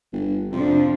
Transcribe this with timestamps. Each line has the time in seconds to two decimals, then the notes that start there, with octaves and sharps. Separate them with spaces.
0.12 G1
0.52 F2 C3 F3 D4